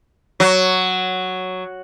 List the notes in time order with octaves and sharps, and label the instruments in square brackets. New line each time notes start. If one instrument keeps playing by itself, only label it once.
[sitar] F#3